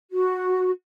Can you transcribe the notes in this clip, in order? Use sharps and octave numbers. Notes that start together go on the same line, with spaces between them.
F#4